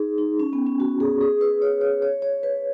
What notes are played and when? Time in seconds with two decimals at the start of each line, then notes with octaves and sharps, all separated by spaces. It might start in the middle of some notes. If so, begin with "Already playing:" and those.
Already playing: D#4 G#4
0.18 D#4
0.40 C#4
0.53 B3
0.67 C#4
0.80 F#4
1.00 G#4
1.21 G#4
1.41 B4
1.62 C#5
1.81 C#5
2.02 C#5
2.22 C#5
2.43 B4